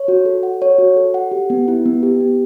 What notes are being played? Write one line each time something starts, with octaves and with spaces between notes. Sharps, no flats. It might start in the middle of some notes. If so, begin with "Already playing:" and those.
Already playing: C#5
F#4
A4
F#5
C#5
F#4
A4
F#5
G4
B3
E4
B3
G4
B3